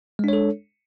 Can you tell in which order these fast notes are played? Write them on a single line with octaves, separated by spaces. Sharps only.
G#3 D4 C#5 A4